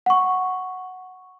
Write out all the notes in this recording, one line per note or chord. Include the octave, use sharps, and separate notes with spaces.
F#5 C#6